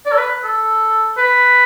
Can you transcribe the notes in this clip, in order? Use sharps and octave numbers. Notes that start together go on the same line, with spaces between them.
D5
A4
B4
A4
B4